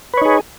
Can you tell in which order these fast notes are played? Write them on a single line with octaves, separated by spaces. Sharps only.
B4 C#5 D#4 G#4